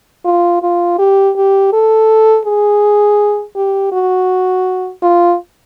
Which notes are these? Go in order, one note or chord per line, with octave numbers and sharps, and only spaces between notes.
F4
F4
G4
G4
A4
G#4
G4
F#4
F4